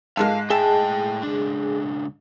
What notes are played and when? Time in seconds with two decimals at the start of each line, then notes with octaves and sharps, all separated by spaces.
0.17 G#2 G#3 A#3 F4 A4 F5
0.50 A2 G#4 E5 G5 A5
1.23 C#2 D4